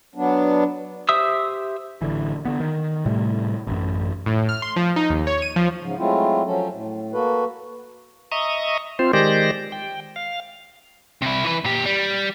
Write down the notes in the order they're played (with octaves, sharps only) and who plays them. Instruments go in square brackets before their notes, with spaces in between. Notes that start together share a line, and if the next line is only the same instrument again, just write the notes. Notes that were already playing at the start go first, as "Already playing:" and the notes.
[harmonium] F#3 B3 D4
[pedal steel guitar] G4 C5 E5 D#6 E6
[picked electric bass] A1 D3 E3
D3 B3
D#3
A2 C3 G3 A3
A1 F#2
[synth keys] A2
F6
C6
F3
D#4
D#2
C#5
D#7
F3
[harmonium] G#2 C#3
F#3 G#3 A3 C4 E4 F4
F3 F#3 C#4 A4
A2
A#3 F#4 A4 B4
[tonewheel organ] D#5 E5 A#5 C#6 D#6
C4 F4 C5
D#3 G#3 G4 C5 D5 A#6
G5
F5
[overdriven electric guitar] C3 E4
E3 B4
A#2 G4
G3